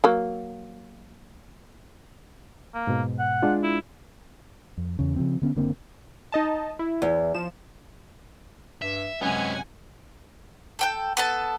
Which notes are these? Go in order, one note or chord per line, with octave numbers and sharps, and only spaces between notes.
F#3 A#3
A#3
G#2 B2
F#5
G#3 D4 F4
E4
F2
E2 C#3
C#3 F3 C4
D3 B3 C#4
F#1 D3 A#3 C4
D#4 D#5 A5
E4
E2
F3 E7
G2 E5
F#2 C3 G#3 B3 C#4 F#5 G#5
A4 G5 G6
B3 A4 A5